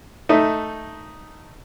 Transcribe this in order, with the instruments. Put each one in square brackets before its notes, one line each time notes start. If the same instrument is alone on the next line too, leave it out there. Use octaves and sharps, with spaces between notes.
[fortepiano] A3 D#4 E5